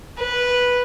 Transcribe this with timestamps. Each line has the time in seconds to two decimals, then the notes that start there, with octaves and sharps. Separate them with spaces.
0.19 B4